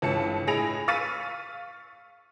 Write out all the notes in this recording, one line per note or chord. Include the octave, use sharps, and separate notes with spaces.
G1 C#2 E3 A5 C#7
A2 G#4 B5 A#6 D7 F7
F5 C#6 E6 A6 B6 D#7